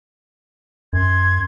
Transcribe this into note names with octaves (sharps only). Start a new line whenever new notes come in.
F#2 C6 G#6